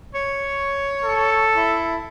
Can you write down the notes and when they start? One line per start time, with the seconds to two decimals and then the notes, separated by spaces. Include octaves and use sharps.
0.14 C#5
1.04 A4
1.56 E4